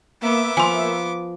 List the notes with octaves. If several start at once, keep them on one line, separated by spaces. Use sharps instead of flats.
A#3 B3 E5 D6
F3 G#5 C6